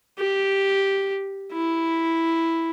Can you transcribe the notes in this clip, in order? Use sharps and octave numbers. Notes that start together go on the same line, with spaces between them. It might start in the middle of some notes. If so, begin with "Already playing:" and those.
G4
E4